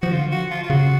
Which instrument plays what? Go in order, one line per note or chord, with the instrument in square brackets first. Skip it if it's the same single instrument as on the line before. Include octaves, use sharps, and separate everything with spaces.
[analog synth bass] F3 [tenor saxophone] F#4
[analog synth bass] D3 [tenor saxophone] F4
[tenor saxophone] F#4
F4
F4
[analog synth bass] C#3 [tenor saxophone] F#4